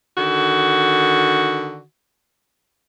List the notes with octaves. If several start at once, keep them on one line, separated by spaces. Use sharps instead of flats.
D3 D#3 F#4